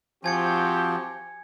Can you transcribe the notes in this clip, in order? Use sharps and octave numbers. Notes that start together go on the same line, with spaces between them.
F3 C4 F#4 G4 G#5 G#6 C#7